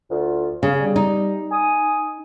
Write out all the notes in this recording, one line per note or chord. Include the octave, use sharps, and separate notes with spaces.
D2 F4
C#3 F5
G3
D#4
G#5 D#6